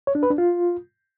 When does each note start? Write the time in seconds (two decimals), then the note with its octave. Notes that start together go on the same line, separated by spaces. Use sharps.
0.07 C#5
0.15 D4
0.23 B4
0.30 D4
0.38 F4